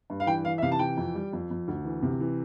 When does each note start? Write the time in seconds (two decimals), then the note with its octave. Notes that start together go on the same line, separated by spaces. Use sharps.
0.10 G2
0.20 F5
0.26 E3 G5
0.45 E3 F5
0.58 E5
0.62 C3 F5
0.72 A5
0.79 E3 G5
0.97 F2
1.15 G3
1.33 F2
1.50 F2
1.68 D2
1.85 E3
2.03 C3
2.20 E3